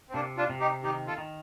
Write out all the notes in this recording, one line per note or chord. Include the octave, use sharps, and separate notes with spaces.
C4
C3 A#3 D4
D4 F4
C3
D#4 G4
D#3 D#4 G4
F4 A4
D#3